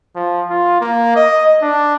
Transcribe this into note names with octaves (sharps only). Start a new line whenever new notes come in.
F3
F4
A#3
D#5
D4